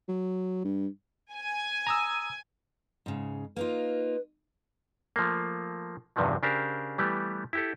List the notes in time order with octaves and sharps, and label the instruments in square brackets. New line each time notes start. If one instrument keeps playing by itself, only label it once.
[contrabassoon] F#3
G2
[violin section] G#5
[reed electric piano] A#5 D#6 E6
[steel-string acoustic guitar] G#2 C#3
[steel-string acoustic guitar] A#3 D#4 F4 [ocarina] B4
[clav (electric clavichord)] F3 A3 A#3
E2 G2 C3 D#3 F3 F#3
C#3 D4 G4 A#4 C5
E3 G3 A3 B3 G4
E4 G4 A4